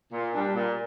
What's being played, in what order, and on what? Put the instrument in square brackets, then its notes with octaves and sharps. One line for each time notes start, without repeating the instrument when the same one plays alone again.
[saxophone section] A#2
G3 D4
A#2